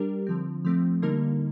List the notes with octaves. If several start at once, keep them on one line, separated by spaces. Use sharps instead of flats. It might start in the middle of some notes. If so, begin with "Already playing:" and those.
Already playing: G3 D4 G4 A#4
D3 F3 C4
F3 A3 C4
D3 G3 A#3 D#4 A#4